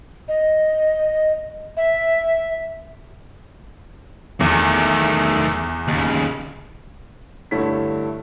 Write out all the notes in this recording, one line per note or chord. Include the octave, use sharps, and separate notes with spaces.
D#5
E5
E2 D#3 A3
D#2 C#3
G2 D3 A3 E4 C#5 B6